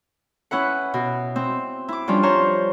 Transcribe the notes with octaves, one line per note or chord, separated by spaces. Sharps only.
C#4 E4 B4 F#5
B2
C4
E4 D6
F3 G3 C#4 D4 F4
C5 C#5 A#5